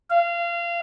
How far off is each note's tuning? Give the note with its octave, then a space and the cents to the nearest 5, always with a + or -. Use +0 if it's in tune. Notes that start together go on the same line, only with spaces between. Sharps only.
F5 -25